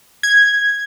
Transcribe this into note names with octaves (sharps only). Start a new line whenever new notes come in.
G#6